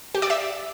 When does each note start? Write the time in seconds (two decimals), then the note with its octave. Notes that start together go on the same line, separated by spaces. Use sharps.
0.15 G4
0.22 D5
0.30 E5